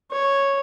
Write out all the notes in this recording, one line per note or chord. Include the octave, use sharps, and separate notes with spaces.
C#5